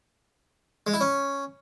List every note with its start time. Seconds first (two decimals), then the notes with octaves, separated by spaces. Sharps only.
0.87 G#3
0.94 E4
1.01 C#4